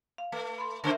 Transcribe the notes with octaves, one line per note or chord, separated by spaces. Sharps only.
F5
A3 B4
B5 C6
C#3 A3 A#4 C5 E5